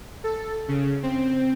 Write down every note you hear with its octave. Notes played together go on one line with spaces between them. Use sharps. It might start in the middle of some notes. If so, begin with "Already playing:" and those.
A4
C#3
C4